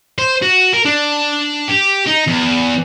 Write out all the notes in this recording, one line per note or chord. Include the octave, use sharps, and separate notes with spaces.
C5
F#4
A#4
D4
G4
D#4
E2